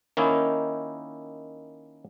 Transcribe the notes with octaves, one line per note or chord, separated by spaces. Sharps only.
D#3 A#3 C#4 D#4 E4